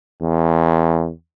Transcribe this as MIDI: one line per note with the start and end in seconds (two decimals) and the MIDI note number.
0.21 1.11 40